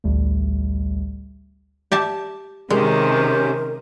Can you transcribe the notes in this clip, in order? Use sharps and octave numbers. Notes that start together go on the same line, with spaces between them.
A1 D2 G3 A3
G4 E5 A5
C3 D#3 G#3 C#4 G4 A#4 C5